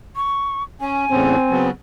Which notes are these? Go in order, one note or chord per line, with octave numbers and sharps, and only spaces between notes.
C#6
C#4 G#5
E2 A2 C#3 C4
C#3 F#3 B3